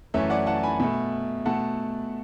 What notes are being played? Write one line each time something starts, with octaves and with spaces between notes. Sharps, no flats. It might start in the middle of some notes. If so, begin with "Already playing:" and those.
F#2 E3 A3 C#5 E5
D5 F#5
F#5 A5
G#5 B5
B2 A3
B2 A3 F#5 A5